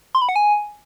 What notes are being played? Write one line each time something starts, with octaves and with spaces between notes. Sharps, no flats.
C6
B5
F#5
G#5